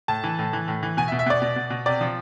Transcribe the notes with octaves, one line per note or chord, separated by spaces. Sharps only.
A2 A5
E3
A2
E3
A2
E3
B2 G#5
E5
B2
E5
B2 D5
B2
B2
B2
C3 D5
F3